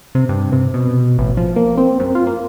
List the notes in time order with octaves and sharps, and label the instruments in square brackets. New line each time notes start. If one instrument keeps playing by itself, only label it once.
[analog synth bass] C3
G2
C3
B2
A1
F3
A#3
C4
F#2
F4
A#3